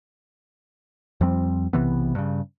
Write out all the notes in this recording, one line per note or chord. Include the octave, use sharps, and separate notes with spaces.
F2 F3 G3 C4
B1 C3 E3 B3
G2 C#3